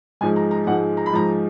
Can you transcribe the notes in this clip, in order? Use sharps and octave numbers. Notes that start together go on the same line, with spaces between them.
G#2 F3 G#3 G#5
A#5
A#5
G#2 F3 G#3 F#5
A#5
B5
G#2 F3 G#3 A#5